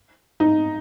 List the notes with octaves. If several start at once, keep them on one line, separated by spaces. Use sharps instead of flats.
D#4